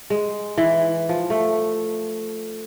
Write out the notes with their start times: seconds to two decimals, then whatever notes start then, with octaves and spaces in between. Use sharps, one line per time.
0.10 G#3
0.58 E3
1.09 F3
1.30 A3